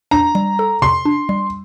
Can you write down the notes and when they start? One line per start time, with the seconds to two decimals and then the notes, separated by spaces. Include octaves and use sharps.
0.11 D4 A#5
0.35 G3
0.59 A4
0.82 C3 C6
1.05 D4
1.29 G3